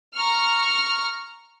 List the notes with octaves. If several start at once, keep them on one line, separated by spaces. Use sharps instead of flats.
A#5 C#6 F6